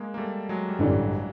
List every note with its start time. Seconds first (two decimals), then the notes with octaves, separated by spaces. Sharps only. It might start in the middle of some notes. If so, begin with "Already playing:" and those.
Already playing: G#3 A#3
0.14 A#3
0.18 G3 A3
0.49 F#3 G#3
0.69 G3
0.79 A1 G2 D3 E3 F#3